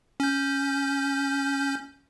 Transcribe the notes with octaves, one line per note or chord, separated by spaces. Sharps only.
C#4 G6